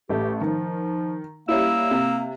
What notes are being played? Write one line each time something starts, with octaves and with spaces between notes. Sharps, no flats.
A1 A3 G4
D#3 F3
G3 A#3 C#4 E4 E6
C3